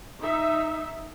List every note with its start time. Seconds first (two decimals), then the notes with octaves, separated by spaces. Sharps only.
0.22 D#4 E5